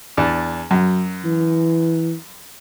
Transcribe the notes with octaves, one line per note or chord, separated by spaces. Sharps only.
E2 D4
F#2 F#3
E3